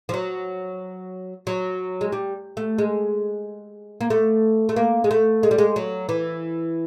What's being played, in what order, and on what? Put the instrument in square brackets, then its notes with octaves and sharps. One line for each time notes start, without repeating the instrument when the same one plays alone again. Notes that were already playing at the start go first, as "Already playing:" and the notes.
[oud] F3
F#3
F#3
G#3
G3
A3
G#3
A#3
A3
A3
A#3
G#3
A3
G#3
G3
G#3
F#3
E3